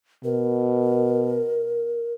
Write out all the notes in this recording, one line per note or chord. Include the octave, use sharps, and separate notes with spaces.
B2 A#4